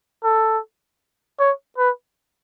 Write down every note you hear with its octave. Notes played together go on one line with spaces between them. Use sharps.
A4
C#5
B4